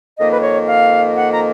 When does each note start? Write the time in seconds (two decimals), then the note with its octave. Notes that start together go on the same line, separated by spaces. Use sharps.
0.18 F2 D#3 A#3 D#5
0.32 B4
0.43 C#5
0.68 F5
1.16 F#5
1.33 A#5